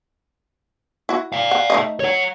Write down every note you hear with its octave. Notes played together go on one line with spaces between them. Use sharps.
E4 F#4
D5 F5
F#5
A3 D#4 D#5
C#5 F#5